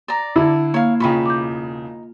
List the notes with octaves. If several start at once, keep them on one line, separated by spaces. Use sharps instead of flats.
D5 A#5
D3 E4
A#3 C#5 F5
E1 C#3 D#4 F4 G5 B5 C#6
D6 G6